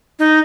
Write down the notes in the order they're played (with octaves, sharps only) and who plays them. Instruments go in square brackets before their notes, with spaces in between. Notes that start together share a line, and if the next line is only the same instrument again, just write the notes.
[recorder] D#4